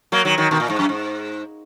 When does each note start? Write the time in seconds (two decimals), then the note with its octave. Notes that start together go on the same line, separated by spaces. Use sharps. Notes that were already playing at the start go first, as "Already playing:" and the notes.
0.12 F#3 A#3
0.25 D#3 F#3
0.38 D#3 F#3
0.51 B2 D#3
0.60 A#2
0.70 G#2
0.79 F#2
0.89 G#2